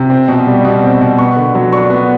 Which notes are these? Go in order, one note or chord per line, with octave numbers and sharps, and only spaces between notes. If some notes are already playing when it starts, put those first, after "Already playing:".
Already playing: C3
C4
B2
G3
B2
C4
B2
B3 C#6
D3
F#3
D4 C#6
B3